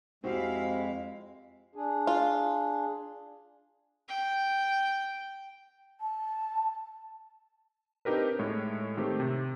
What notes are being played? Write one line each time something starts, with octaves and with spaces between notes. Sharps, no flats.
F2 G#3 C4 E4 F#4 G4 F5
D4 G#4
F4
G5
A5
C4 D4 D#4 G4 A#4 B4
A2 G#3 C#5
D#3 A3 C4 G4
C3